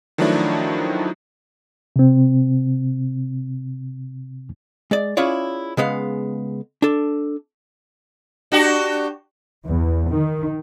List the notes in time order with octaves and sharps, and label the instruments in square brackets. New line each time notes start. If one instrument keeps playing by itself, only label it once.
[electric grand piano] D#3 F3 F#3 A3 D4 E4
[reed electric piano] C3 C4
[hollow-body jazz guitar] G#3 D5
C#4 E4 F4 G#4 C#5 D5
C#3 G#3 B3 F5
D4 A4
[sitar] D4 F#4 G4
[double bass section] E2
D#3